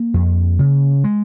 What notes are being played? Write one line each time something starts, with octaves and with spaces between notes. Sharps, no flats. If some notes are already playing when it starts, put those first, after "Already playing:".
Already playing: A#3
F2
C#3
G#3